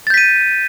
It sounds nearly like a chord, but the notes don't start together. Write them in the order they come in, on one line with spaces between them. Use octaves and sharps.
A6 G6 B6 D#7